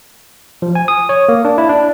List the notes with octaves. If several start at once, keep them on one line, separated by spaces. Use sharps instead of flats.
F3
G#5
D#6
C#5
A#3
D4
E4
D4